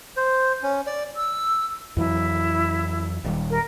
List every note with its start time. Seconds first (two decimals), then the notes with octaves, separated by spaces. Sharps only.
0.17 C5
0.63 C#4
0.87 D5
1.16 E6
1.97 F2 E3 F#3 E4
3.24 D#1 D#2 G3
3.50 A#4